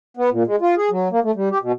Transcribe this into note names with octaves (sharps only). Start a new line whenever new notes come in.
B3
A#2
G#3
F4
G#4
F#3
A#3
A3
G3
G4
B2